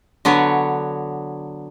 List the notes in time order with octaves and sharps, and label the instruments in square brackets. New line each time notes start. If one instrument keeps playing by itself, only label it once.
[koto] D3 F#3 B3 B4 C#5